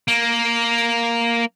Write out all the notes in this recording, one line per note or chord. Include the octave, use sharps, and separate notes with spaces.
A#3